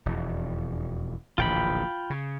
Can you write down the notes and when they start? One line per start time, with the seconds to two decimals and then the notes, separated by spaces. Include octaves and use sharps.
0.06 E1 F2
1.38 D1 A#1 E3 F4 G5 B5
2.10 C#3